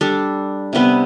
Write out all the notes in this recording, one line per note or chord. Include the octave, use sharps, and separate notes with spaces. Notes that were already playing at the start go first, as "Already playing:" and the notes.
G3 D4 A4
C3 G3 B3